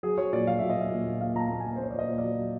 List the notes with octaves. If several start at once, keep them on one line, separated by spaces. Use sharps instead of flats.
F#3 G#4
F#3 C#5
A#2 D5
F#3 F5
A#2 E5
D#5
A#2 E5
A#2
A#3
A#2 F5
A#2 A5 A#5
A#3
A#2 G#5
C5
A#3 C#5
D5
A#2 D#5
A#2
F#3 D5